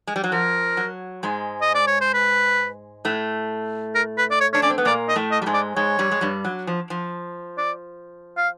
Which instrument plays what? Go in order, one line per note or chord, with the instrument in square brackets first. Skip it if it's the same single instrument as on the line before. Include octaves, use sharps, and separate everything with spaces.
[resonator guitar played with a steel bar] G#3
G3
F#3
[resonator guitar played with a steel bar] F3 [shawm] A#4
[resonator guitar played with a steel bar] F#3
G#2 G#3
[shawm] D#5
D5
C#5
C5
B4
[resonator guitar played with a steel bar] A2 A3
[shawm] A#4
B4
D5
C#5
[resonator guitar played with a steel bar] D4 [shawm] C#5
[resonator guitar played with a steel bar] C#4 [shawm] D5
[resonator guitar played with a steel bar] C4
B3
[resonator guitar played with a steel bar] A#2 A#3 [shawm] D5
[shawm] D#5
[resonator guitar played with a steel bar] A2 A3
[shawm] D#5
[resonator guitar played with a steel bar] G3
G#2 G#3
[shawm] D5
[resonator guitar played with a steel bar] G#2 G#3 [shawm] C#5
[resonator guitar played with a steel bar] G2 G3
G#3
G2 G3
F#3
F3
F3
[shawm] D5
F5